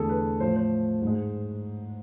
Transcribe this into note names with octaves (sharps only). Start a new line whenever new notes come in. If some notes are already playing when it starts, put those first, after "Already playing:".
Already playing: E2 D3 A3 G#4 A4
B4
A2 F3 A3 C5
C5
G#2 G#3